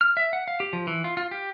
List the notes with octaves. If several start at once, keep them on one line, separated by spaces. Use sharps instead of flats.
F6
E5
F#5
F5
G4
F3
E3
F4
F4
G4